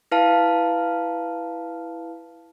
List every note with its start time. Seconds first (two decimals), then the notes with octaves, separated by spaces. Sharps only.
0.11 E4 B4 F5 A5